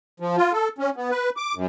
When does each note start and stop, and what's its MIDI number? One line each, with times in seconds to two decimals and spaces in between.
0.20 0.36 53
0.37 0.52 65
0.53 0.68 69
0.78 0.90 61
0.96 1.10 59
1.11 1.30 71
1.37 1.54 86
1.55 1.66 42